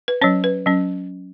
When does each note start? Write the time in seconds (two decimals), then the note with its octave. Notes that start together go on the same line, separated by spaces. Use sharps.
0.08 B4
0.22 F#3 C#4 C#5
0.44 B4
0.66 F#3 C#4